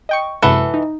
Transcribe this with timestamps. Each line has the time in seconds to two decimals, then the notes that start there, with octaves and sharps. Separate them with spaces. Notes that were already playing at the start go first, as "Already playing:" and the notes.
0.09 D#5 G5 C#6
0.42 F#2 C3 E3 G#3 A4 F#5
0.74 D#4